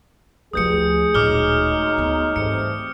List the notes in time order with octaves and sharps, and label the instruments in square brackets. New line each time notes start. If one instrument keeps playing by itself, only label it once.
[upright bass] D2 F3 [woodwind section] G2 [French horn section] G#4 [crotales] D#6 G6 C#7
[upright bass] D1 A#2 [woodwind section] F#3 G#3 D#4 [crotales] D6 F6 G7
[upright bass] D2 B3
[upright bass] G#2 E3 [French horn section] G3 A3 C4 [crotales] C#7